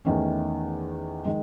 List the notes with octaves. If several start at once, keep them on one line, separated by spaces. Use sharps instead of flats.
E2 D#3 A3 C#4
D#3 G#3